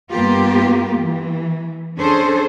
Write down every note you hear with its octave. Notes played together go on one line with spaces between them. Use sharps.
G2 A#3 B3 F4 G4
E3
C#4 D4 G#4 A4 C5